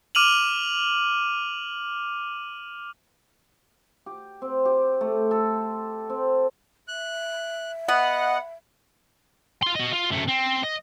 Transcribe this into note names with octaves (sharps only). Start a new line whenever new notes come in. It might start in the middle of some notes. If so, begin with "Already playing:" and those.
D6 F6 D#7 F7 F#7
G4
C4
G4
A3
A4
C6
C4
E5 F#6
B3 D#5 F#5
F4 C6
F#4 D#5
F4
F#2 A3
C4
D#5